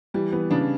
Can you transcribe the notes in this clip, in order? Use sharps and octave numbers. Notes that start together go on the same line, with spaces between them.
E3 G3
E3 B3
C#3 D4